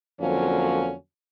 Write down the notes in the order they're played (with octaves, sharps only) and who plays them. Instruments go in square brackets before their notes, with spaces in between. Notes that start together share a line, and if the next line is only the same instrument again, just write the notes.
[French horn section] F2 D3 F3 F#3 A#3 C#4